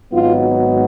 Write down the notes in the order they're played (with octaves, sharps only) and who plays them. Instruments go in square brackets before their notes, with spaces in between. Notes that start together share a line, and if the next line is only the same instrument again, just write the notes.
[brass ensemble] G#1 G#2 F#3 B3 D#4 F4